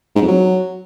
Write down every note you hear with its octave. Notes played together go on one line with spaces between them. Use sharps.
G#2
F2
F#3